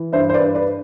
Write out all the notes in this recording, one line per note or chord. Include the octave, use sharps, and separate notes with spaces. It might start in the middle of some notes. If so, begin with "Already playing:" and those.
Already playing: E3
G2 C5 E5
C5
B4 D5
G2
B4 D5